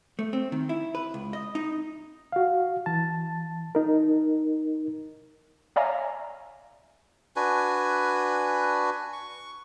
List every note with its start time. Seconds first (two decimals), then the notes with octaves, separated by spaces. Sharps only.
0.19 A3
0.33 C4
0.52 D#3
0.69 E4
0.95 B4
1.14 C#2
1.33 D#5
1.55 D#4
2.32 F#4 F5
2.86 E3 A5
3.75 D#4 A#4
5.76 C#5 D5 E5 F5 G#5 A#5
7.36 D4 F#4 B4 G#5
9.13 C#6